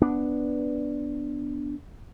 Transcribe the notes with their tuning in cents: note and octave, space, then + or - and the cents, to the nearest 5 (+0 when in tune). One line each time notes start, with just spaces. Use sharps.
B3 +0 D4 +0